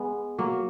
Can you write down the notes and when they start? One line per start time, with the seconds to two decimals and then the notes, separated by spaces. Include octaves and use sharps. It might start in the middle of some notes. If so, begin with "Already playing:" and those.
Already playing: G#3 B3
0.39 F#3 A#3